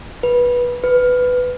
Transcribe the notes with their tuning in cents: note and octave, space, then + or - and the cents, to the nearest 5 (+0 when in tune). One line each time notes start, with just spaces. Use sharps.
B4 -15
B4 +10